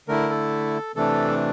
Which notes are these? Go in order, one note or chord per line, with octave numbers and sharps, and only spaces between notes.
D3 A3 E4 A#4
A4
C3 E3 A3 D4 A4